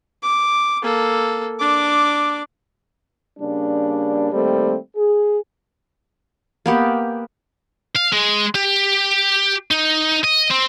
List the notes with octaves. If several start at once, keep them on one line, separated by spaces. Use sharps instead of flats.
D6
A#3 A4
D4 D6
C#3 G3 A#3 D4
D#3 G3 A3 A#3 C4
G#4
A#3 B3 G4
F5
G#3
G4
D#4
D#5
C4